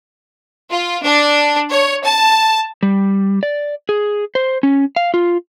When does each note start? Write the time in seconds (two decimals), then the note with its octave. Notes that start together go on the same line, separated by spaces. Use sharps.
0.71 F4
1.02 D4
1.70 C#5
2.04 A5
2.83 G3
3.43 D5
3.89 G#4
4.35 C5
4.63 C#4
4.96 F5
5.14 F4